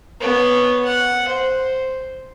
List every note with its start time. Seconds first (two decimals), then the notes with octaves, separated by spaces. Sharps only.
0.20 B3 C#5
0.85 F#5
1.28 C5